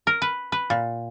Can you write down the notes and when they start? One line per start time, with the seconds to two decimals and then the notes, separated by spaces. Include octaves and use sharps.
0.07 A#4
0.22 B4
0.52 B4
0.70 A#2